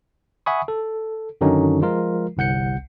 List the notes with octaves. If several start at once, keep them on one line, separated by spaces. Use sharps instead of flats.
E5 F#5 G#5 B5 C#6 D#6
A4
F#2 D3 D#3 F#3 C#4 D#4
F3 G#3 F4 A#4
G1 C2 F#5 G6 C#7